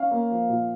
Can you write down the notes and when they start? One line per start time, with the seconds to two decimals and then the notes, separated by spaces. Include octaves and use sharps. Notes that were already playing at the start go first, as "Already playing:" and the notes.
Already playing: C#4 F5
0.11 A#3
0.31 F3
0.50 A#2